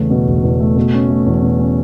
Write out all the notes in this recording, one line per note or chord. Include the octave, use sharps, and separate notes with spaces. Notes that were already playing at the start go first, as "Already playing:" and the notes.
Already playing: E2 C#3 A3
B2
E1
E2
A3
B2
C#4
A3
E2
B2
C#4